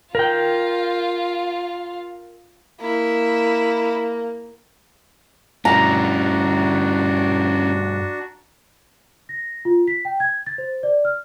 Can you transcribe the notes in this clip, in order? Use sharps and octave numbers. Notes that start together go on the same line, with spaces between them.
F4 A#4 G5
A#3 E4
G2 A3 C#4 D4 E4 F#4 A#5
A#6
F4
B6
G5
G#6
A6
C5
D5
F6